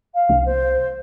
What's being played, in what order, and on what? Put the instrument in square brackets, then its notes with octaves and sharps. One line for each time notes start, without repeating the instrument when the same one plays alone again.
[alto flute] F5
[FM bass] C2
[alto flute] C5